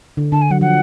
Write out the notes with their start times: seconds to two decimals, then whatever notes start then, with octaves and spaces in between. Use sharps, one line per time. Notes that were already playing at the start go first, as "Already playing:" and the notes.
0.17 D3
0.32 D3 A5
0.42 G#5
0.50 F#3 F#5
0.61 F3 F#5